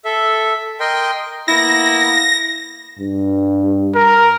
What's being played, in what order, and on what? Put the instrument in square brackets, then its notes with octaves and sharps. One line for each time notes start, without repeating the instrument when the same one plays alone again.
[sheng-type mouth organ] A4 E5
A#4 D#5 G5 C6
[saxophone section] A#3 B3 E4 [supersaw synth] A#6
[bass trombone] G2
[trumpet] A#4